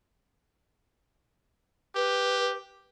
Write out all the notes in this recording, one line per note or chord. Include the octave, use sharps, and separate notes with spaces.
G4 B4